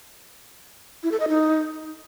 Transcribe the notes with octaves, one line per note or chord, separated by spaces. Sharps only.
E4
A4
D#5
D#4